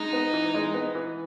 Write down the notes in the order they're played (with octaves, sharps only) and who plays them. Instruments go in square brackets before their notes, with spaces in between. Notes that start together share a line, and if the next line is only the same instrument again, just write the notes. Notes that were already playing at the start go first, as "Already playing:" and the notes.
Already playing: [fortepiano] G#3 [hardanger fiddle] D#4
[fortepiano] B3
E3
G#3
B3
E3